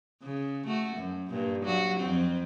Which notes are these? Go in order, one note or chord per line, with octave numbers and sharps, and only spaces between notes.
C#3
A3 F#4
F#2
G2 A#2
F#3 F#4
F2 C4